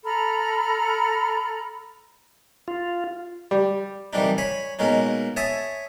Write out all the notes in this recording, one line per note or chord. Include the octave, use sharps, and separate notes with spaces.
A4 A#5 B5 F6
F4
G3
C2 E3 G3 D4 D#4
C#5 G#5 B5
B2 G#3 A#3 C#4 D#4
C#5 E5 G#5 A5 D#6